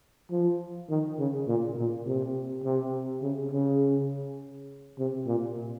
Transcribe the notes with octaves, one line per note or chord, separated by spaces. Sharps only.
F3
D#3
C#3
A#2
A#2
C3
C3
C#3
C#3
C3
A#2